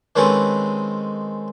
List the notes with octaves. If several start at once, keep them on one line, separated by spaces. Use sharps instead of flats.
D#3 G#3 C4 C#4 A4 B4